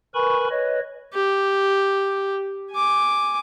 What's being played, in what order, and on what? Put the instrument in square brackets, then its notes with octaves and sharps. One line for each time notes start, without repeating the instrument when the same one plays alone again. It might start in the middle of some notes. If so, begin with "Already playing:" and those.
[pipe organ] A#4 B4 G#5 B5 C#6
B4 C#5 D#5
[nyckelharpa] G4
G#5 D6